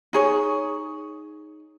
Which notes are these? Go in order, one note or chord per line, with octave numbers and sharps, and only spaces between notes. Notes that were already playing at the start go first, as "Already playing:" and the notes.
D#4 G#4 C#5